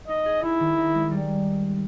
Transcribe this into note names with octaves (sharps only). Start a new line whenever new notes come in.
D#4 D#5
G#4
D#4 E4
D#3
D#4
G#3
G3